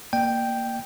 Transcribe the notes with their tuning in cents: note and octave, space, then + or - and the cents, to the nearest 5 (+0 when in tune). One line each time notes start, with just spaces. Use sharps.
A#3 +0 D5 +35 G5 +0